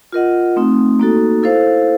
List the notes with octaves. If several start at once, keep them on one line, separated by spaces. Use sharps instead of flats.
F4 A#4 D#5 F#5
A3 C4 D#4
A#3 D#4 F#4 A4
E4 A4 C5 F5